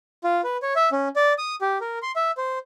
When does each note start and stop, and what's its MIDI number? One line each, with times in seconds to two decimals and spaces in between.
0.24 0.41 65
0.44 0.57 71
0.62 0.74 73
0.76 0.89 76
0.92 1.08 61
1.16 1.33 74
1.38 1.55 87
1.61 1.78 67
1.81 1.99 70
2.02 2.12 84
2.16 2.31 76
2.37 2.59 72